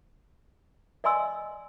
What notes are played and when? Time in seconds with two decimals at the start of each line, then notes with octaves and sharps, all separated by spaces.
1.04 D5 D#5 G#5 C6 E6